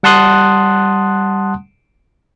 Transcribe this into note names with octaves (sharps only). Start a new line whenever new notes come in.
G3 F#5 A5 C6 D#6 F#6